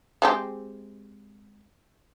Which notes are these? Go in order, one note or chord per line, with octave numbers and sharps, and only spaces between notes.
G#3 C4 G4